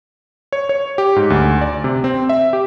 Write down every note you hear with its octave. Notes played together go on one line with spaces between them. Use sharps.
C#5
C#5
G4
G#2
D2
D5
C3
C4
E5
G4